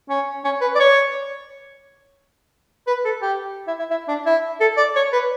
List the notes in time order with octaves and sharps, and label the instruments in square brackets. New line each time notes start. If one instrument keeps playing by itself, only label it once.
[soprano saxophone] C#4
C#4
B4
D5
C#5
B4
A4
G4
E4
E4
E4
D4
E4
A4
D5
C#5
B4